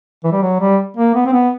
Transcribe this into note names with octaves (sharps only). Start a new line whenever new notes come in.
E3
G3
F#3
G3
A#3
B3
C4
B3